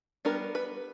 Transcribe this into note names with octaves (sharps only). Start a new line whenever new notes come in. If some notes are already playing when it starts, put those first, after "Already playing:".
G3 B3 D4 A#4
B4